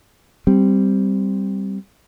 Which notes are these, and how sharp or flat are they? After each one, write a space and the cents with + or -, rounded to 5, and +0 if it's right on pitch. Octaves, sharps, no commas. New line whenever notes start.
G3 -5 C4 +0